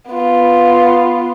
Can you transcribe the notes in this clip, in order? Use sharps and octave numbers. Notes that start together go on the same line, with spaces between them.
B3 F4